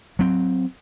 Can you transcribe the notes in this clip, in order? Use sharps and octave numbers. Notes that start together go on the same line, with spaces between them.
F#3 C4